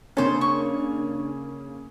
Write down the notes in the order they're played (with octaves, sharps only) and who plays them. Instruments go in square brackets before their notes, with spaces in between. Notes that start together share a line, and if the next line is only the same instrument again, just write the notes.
[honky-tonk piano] C#3 A#3 C#4 [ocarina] D4 [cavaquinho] A4 C5
[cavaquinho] C#6